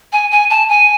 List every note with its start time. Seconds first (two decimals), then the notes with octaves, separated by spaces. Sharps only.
0.13 G#5
0.31 G#5
0.50 A5
0.69 G#5